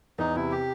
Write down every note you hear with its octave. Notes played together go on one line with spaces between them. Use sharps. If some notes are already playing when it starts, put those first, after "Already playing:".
E2 D#4
C3 E4
G4